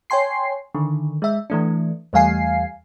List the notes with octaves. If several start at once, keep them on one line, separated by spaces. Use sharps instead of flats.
C#5 G5 G#5 C6 C7
D3 D#3
G#3 E5
E3 A3 D4
E2 G3 A3 F5 G#5 C7